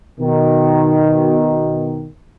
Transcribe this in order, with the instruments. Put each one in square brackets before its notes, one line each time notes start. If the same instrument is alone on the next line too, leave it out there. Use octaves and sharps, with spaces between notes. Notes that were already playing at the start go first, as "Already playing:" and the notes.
[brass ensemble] B2 D#3